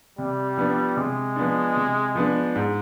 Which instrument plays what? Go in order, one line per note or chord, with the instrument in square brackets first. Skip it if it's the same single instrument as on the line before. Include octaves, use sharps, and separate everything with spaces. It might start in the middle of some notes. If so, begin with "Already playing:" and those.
[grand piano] C3 [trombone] G3
[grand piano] F3 B3 D4
[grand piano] C3 [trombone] G#3
[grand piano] F3 B3 D4
C3
F3 B3 D4
G#2